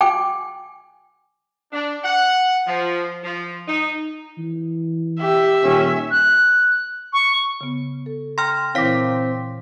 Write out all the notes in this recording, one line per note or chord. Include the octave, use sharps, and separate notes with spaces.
G5 G#5 D6
D4
F#5
F3
F3
D#4
E3
G4 E5
D#1 C#4
F#6
C#6
C#3 B3
A4
G5 A#5 C6 F6 A#6
A#2 E3 C4 E4 C#5 F5 D6 B6